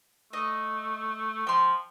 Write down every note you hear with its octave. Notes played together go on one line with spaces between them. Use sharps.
A3 D#5
F3 G5 C6